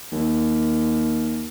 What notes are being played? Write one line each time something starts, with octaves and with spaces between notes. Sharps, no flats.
D#2